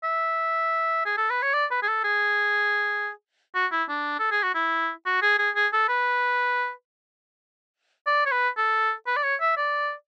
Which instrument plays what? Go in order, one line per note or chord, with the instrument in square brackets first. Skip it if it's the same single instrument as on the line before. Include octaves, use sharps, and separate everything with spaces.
[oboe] E5
G#4
A4
B4
C#5
D5
B4
G#4
A4
G#4
F#4
E4
D4
A4
G#4
F#4
E4
F#4
G#4
G#4
G#4
A4
B4
D5
C#5
B4
A4
B4
D5
C#5
E5
D5